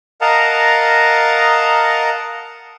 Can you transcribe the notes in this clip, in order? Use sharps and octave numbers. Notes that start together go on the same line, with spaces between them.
A#4 D#5 F5 F#5 A5 A#5